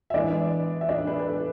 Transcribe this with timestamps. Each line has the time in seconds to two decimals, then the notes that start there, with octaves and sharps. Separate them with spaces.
0.10 E5
0.14 E3 G#3 B3 D4 D5
0.81 E5
0.89 D4 D5
1.07 B3 B4
1.19 B4
1.27 A4